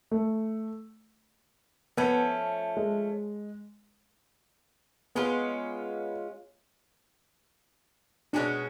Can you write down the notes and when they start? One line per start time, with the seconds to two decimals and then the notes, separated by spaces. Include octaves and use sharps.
0.11 A3
1.97 F3 A3 B3 C#4
2.77 G#3
5.15 G#3 B3 C#4 F4
8.33 B2 G#3 C#4 D4 F#4